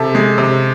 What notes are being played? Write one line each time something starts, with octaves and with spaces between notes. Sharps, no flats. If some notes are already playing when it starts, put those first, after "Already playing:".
Already playing: C3 A4
G#3
C3